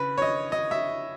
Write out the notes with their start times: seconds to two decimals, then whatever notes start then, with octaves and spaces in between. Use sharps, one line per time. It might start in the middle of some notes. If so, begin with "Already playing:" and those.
Already playing: C#3 B4
0.18 C#5
0.22 D#5
0.52 D#5
0.71 E5